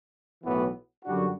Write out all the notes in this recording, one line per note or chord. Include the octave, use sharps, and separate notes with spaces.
B1 A2 E3 B3 F#4
F#2 D3 G3 D4 F#4